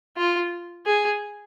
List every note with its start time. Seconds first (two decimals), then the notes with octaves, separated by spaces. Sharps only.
0.17 F4
0.86 G#4